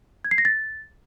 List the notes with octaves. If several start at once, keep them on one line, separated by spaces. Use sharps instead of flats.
G#6
C7
A#6
A6